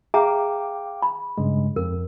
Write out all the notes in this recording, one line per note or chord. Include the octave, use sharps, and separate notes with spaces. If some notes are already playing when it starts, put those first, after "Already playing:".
G#4 E5 F5 G5 A#5 D6
B5
G2 C#3 G#3
F2 A#4